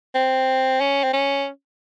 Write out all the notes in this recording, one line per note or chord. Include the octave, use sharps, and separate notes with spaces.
C4
C#4
C4
C#4